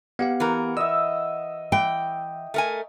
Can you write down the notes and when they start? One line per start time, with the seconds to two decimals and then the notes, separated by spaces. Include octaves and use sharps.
0.19 B3 G4 F5 F#5
0.40 E3 A#4
0.77 D#5 E5 E6
1.72 E3 G5
2.54 A3 A#4 G#5